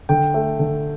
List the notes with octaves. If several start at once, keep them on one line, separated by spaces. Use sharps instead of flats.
D3 G5
A3
D3